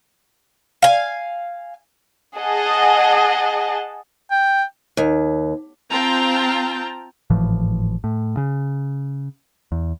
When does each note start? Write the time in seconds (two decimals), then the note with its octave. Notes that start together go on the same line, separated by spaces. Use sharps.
0.82 F5 G#5
2.38 G#4 D#5 F#5 A5
4.31 G5
4.97 D#2
5.91 C4 F4 G5 A5 A#5
7.30 G#1 A2 E3 F3
8.04 A2
8.37 C#3
9.72 E2